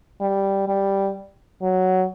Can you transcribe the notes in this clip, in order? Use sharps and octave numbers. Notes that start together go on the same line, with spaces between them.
G3
G3
F#3